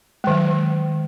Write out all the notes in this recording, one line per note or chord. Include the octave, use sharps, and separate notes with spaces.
D#3 F#3 G#3